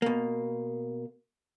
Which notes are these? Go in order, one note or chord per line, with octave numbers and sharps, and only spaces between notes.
B2 A#3